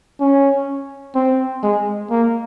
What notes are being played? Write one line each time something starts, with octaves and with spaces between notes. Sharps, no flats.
C#4
C4
G#3
A#3